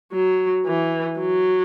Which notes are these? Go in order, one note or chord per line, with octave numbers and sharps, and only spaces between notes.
F#3
E3
F#3